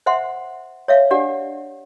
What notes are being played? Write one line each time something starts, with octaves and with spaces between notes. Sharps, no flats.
C5 E5 F#5 C6
C#5 E5 F5
D4 G4 D5 F#5